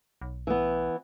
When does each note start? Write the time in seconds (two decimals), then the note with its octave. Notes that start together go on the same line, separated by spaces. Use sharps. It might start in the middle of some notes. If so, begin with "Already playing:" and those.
0.21 B1
0.47 E3 B3